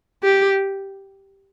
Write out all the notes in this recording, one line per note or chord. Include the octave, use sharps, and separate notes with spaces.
G4